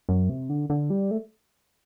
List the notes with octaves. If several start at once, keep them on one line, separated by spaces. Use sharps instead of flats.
F#2
C3
D3
D3
G3
A3